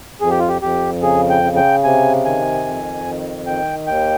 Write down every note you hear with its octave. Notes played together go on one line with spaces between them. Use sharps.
F2 G#4
G4
F4
G4
F2 G4
C#3 G#4
G5
C#3
G5
C3 G#5
D#3 G#5
F2
D#3
D#3 G5
D#2 G5